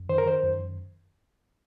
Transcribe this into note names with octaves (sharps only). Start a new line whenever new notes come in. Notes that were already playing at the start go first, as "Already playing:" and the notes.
Already playing: F#2
D#3 C5
A#4
D#3 C5
F#2